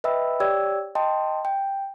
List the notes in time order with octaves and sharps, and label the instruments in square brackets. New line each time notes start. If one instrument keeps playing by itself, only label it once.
[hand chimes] B4 D#5 E5 G5 B5 E6
G4 C#5 D5 G5 E6 G#6
D#5 G5 A5 C6
G5